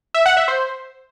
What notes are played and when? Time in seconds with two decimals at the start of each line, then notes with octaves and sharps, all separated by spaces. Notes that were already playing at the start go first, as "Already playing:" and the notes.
0.14 E5
0.26 F#5
0.37 E5
0.48 C5